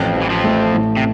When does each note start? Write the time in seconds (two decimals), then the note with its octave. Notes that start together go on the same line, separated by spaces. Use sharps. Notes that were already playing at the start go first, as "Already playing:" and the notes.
Already playing: A1 F2
0.15 A1
0.22 E3
0.30 F2 F3
0.44 A3
0.74 A2
0.97 C3